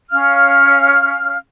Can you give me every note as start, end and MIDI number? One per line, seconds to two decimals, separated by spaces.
0.11 1.36 61
0.11 1.36 77
0.11 1.36 89